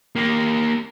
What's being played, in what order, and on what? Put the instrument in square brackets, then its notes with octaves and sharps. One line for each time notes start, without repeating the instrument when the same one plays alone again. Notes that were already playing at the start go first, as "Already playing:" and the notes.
[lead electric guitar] A#3 G4